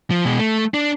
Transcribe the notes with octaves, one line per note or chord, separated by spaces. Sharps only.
F3
B2 G#3
A3
D4